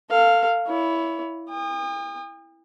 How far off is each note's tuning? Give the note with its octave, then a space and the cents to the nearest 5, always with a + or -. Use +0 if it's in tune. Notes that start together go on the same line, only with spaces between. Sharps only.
A4 +35 F5 +0
E4 +0 C#5 +30
G5 +45 D#6 -30